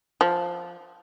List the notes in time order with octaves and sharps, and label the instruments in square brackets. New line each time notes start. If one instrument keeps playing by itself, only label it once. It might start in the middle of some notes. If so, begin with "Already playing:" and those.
[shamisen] F3